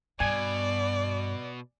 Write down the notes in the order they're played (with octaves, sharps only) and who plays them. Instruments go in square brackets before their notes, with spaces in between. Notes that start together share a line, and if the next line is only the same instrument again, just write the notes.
[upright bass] G2 [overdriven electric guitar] B2 [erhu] D5 [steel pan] G#5